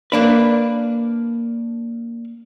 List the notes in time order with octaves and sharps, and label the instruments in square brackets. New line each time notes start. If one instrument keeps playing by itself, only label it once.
[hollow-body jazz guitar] A#3 D4 B4